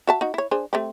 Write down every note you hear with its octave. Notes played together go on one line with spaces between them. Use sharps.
F#4 E5 A5
D#4 F#4
E4 C#5
D4 G#4 C5
A3 C4 G4